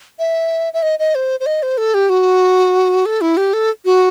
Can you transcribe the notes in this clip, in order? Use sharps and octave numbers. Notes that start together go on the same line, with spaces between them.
E5
E5
D#5
D#5
C5
C5
D#5
C5
A4
G4
F#4
A4
E4
G4
A4
F#4